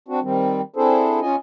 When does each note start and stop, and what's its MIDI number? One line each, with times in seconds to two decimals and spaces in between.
0.08 0.20 60
0.08 0.20 62
0.08 0.20 66
0.23 0.61 51
0.23 0.61 55
0.23 0.61 60
0.76 1.20 60
0.76 1.20 62
0.76 1.20 64
0.76 1.20 68
0.76 1.20 69
0.76 1.20 72
1.22 1.36 61
1.22 1.36 65
1.22 1.36 75
1.22 1.36 80